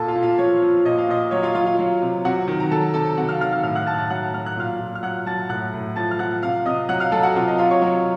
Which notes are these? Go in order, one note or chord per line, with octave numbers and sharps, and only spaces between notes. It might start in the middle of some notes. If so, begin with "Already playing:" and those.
Already playing: A#2 A4 A5
F4 F5
A#2
F4 F5
F3 C#5
F3
A#2 D#5
F5
A#2 D#5
F#3 C#5
F4 F5
F#3 F4 F5
F4 F5
F#3
C3
C3 F#4 F#5
D#3
A#5
F#3 A4 A5
C3 A4 A5
C3 F#4 F#5
F5 F6
D#3 F5 F6
F5 F6
A2 F5 F6
F#5 F#6
A2 A5 A6
F#6
A5 A6
F#3 F#5 F#6
F#3 F6
F#6
A#2 F5 F6
A#2
F6
F#3 F#5 F#6
F#3 A5 A6
A2 F#5 F#6
A2
F3 A5 A6
F6
F3 F#5 F#6
C3 F5 F6
C3 D#5 D#6
F#3 F#5 F#6
F5 F6
F#3 A4 A5
F#4 F#5
C3 F4 F5
D#5
C3 F4 F5
C#5 C#6
F#3